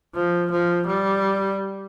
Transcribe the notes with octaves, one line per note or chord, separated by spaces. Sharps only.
F3
F3
G3